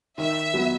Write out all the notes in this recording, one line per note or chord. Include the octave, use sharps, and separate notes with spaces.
D#3 E5
F#3 B3